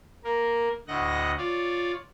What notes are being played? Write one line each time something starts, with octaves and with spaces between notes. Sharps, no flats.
A#3 A#4
D2 A2 D#5 F#5 A#6
F4 C#5 D5